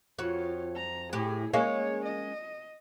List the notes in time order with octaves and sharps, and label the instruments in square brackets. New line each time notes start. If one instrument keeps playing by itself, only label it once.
[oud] F2 F#4 [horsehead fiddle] F4 C#5
[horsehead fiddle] A#5
[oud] A2 G4 [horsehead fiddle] E4 G#4
[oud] G#3 A#3 C#4 [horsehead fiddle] C#5
[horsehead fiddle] D#5